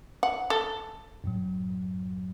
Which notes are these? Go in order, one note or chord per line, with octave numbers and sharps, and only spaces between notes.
F#5
A4
F#2 A2 F#3